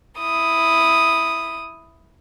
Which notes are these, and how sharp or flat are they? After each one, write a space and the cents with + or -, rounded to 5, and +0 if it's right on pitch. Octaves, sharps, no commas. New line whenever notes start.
E4 +0 D#6 +0